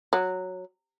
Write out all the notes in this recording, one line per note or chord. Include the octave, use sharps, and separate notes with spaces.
F#3